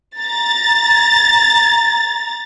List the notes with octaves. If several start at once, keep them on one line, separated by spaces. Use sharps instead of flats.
A#5 A6